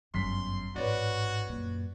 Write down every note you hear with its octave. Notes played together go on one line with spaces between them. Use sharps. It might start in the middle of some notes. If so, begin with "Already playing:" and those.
G1 F#2 G#3 C6 B6
A1 G#2 F#4 B4 C#5 D5
F#2 A#2